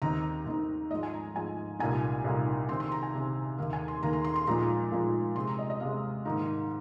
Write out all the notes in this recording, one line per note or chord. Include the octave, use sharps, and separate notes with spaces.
D#2 D#3 C4 D#4 A#5
D#2 D#3 C4 D#4
G#2 F3 G#3 D#5
G#5
A#5
G#2 F3 G#3 G#5
C2 A#2 A#3 D#4 G#5
C2 A#2 A#3 D#4
C3 D#3 C4 C6
C6
A#5
G#5
C3 D#3 C4
D#2 D#3 A#3 F5
G#5
C6
D#2 D#3 A#3 A#5
C6
C6
C6
A#2 F3 G#3 D#4 A#5
A#2 F3 G#3 D#4
C3 G#3 C4 C6
A#5
D#5
D#5
C3 G#3 C4 F5
G#2 D#3 A#3 D#4